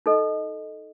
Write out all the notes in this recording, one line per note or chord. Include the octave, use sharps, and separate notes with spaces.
D#4 A4 D#5